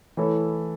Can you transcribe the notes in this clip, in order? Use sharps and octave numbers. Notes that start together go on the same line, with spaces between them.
E3 A3 E4 A4 C#5